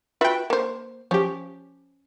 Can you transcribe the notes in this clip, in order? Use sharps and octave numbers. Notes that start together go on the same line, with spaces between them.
F4 F#4 B4 E5 G5
A#3 C5
F3 C#4 G4